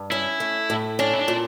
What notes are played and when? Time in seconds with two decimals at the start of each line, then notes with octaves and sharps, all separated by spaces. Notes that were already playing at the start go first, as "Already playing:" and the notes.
Already playing: G2
0.11 C#4 E4
0.40 A3
0.70 A2
0.99 C#4 D4
1.14 E4
1.18 D4
1.28 A#2